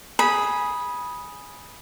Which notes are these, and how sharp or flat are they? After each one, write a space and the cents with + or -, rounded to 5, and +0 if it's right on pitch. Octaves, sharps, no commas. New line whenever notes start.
G#4 +0 B5 -15